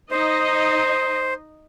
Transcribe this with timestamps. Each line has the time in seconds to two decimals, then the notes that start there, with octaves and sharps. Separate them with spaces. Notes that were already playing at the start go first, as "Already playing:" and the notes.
0.11 D#4 C5 D#5